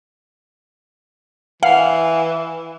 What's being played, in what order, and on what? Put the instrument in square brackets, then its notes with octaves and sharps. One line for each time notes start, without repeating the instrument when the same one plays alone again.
[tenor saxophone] E3 [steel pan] F5 [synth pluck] F#5